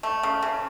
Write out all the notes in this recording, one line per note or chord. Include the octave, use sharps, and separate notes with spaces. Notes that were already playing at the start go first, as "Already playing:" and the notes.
A3
C#3
C#3